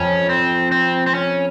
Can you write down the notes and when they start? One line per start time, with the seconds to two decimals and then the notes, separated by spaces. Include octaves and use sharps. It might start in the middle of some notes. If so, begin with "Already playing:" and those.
Already playing: F2 C#4
0.29 C4
0.72 C4
1.07 C4
1.14 C#4